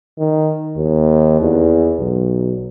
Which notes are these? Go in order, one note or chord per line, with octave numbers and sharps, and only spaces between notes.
D#3
D#2
E2
B1